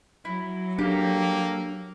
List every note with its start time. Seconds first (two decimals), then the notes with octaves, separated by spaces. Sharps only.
0.25 F#3 E4
0.79 A#3 D4 G4 A4